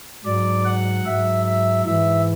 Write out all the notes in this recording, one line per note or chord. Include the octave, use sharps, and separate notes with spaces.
G#2 F#3 D5
F#5
G#2 E5
F#3
E5
G#2 E3 E5